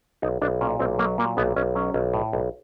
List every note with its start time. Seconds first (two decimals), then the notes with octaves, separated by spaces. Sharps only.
0.22 B1 D#4
0.42 B1 D4
0.61 A#2 C#4
0.79 B1 C4
0.99 F#3 A#3
1.18 A#2 A#3
1.37 B1 B3
1.56 B1 C#4
1.75 F#3 C#4
1.94 B1
2.14 A2
2.33 B1